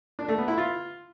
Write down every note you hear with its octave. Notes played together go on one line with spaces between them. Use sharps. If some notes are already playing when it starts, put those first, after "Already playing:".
D4
A3
B3
E4
F4